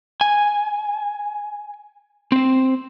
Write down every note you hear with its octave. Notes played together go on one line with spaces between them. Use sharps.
G#5
C4 C5